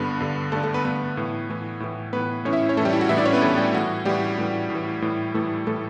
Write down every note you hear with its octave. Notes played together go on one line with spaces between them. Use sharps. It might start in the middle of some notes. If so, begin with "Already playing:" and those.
Already playing: G2 D3 B3 B4
G2 D3
G2 D3 A3 A4
A3 A4
B3 B4
G2 D3 B3 B4
A2 E3
A2 E3
A2 E3
A2 E3 B3 B4
A2 E3 C#4 C#5
E4 E5
C#4 C#5
A2 E3 A3 A4
G3 G4
E4
F#4
A2 E3 E4 E5
D4 D5
C#4 C#5
B3 B4
A2 E3 A3 A4
G3 G4
A2 E3 F#4
A2 E3 G3 G4
A2 E3
A2
E3
A2 E3
A2 E3 A3 A4
A2 E3 A3 A4